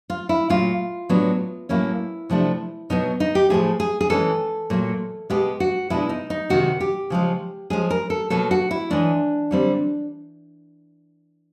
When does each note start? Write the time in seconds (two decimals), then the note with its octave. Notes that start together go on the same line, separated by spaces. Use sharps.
0.10 F4
0.29 E4
0.49 A#2 F#3 A3 F4
1.09 A2 F#3 B3 D4
1.69 A2 F#3 A#3 C#4 E4
2.30 C3 F3 A3 D4
2.90 B2 F#3 B3 D#4
3.20 D#4
3.35 G4
3.50 A2 F3 A3 G#4
3.80 G#4
4.01 G#4
4.10 E3 G#3 C#4 A4
4.70 A#2 F#3 A3
5.30 B2 G#3 B3 G4
5.60 F#4
5.90 B2 G#3 B3 D4 E4
6.09 D#4
6.30 D#4
6.49 C3 D#3 G#3 F#4
6.80 G4
7.10 C#3 F3 G#3
7.70 F3 G#3 C#4 G#4
7.90 A#4
8.10 A4
8.30 B2 F#3 A#3 A4
8.51 F#4
8.71 E4
8.90 E3 G#3 C#4 D4
9.51 D3 G3 C4